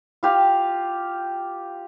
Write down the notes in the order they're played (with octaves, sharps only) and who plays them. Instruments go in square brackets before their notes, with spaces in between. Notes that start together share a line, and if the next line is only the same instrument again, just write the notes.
[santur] F4 G4 F5